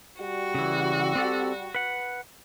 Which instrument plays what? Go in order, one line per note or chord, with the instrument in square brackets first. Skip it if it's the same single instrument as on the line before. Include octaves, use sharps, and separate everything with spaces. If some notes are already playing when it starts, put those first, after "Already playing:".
[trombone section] G3 [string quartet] F#4
[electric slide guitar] C#3 E3
C4 G4 A4
B4 F#5